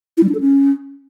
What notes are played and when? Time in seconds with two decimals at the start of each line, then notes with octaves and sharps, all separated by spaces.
0.17 E4
0.23 G3
0.29 D4
0.35 A4
0.40 C#4